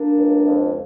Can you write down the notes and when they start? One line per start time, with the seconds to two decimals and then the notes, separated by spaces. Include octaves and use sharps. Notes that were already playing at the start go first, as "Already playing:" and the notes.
Already playing: A#3 D4
0.16 C#2
0.46 F2